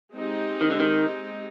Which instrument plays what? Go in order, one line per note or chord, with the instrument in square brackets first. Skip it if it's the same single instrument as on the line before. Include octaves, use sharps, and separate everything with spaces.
[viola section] G#3 C4 D#4 G4
[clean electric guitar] D#3
D3
D#3